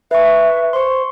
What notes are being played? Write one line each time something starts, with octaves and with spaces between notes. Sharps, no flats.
B4 E5 C#6
C5 C6 C#6